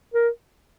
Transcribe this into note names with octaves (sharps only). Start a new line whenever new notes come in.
A#4